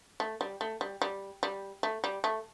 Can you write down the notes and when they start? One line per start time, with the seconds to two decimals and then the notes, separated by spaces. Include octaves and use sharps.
0.20 A3
0.41 G3
0.61 A3
0.81 G3
1.02 G3
1.43 G3
1.83 A3
2.04 G3
2.24 A3